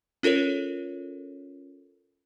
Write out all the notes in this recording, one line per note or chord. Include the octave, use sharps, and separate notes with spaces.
C#4 F4 A4 A#4 C#5